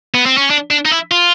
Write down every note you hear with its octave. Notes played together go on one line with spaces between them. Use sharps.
B3
C4
C#4
D4
D4
D#4
E4
F4